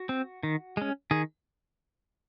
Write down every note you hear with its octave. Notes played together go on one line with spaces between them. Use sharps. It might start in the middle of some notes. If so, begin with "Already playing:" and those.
Already playing: F#4
C4
D#3
G#3 C#4
D#3 G#4